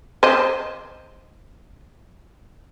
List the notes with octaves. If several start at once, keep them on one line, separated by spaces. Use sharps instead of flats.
C5 D#5